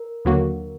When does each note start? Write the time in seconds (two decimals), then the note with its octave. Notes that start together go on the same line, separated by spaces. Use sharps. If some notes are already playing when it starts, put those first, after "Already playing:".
Already playing: A#4
0.25 D#2 D3 F#3 A#3 F#4